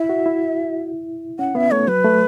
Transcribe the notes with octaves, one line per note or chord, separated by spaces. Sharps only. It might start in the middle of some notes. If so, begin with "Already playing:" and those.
Already playing: E4 E5
F#4
E4
C#4 F#5
B3 E5
A3 C#5
F#3 B4
A3